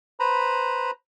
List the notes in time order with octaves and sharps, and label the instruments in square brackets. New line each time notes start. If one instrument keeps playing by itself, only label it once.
[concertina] B4 C5 A#5 B5